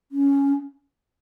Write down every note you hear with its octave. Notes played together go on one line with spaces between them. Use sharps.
C#4